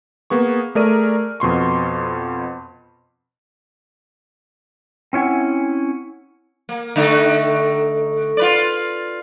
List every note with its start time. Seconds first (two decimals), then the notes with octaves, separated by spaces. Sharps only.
0.30 A#3 B3 G#4 C#6
0.75 A3 G#4 A#4 D5 F6 D#7
1.40 F2 B2 C6 C#6
5.13 C4 C#4 E4 F#5 G#5
6.69 A#3
6.96 D3 A3 D#4
8.37 F4 B4 D5